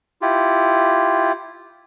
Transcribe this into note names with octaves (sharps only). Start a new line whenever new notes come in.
E4 F4 G4